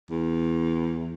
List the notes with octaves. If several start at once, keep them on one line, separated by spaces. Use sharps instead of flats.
E2